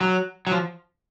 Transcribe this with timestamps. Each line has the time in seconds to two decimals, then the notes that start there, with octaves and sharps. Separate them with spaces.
0.01 F#3
0.47 F#3
0.52 F3